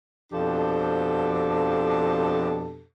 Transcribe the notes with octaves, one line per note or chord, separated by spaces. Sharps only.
F2 B2 F3 D4 G4 A4